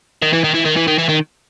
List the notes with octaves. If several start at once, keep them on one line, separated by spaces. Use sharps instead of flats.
D#3
E3
D#3
E3
D#3
E3
D#3
E3
D#3